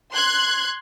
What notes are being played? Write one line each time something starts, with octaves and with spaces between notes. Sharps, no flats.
C6 F#6 G#6